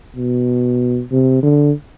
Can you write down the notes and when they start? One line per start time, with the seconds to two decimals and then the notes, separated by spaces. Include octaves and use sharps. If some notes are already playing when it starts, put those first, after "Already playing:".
0.16 B2
1.11 C3
1.43 D3